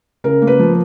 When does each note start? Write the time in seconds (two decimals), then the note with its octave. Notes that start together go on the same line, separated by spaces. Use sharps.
0.24 C#3 A#4
0.42 A#3
0.47 B4
0.59 F3